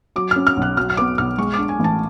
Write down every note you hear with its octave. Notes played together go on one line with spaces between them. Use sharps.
F#3 D6
C#4 F6
F6
B1 F#6
F#3 F6
F6
B3 D6
B1 F6
G#3 C#6
D6
D4
G#5
A1 A5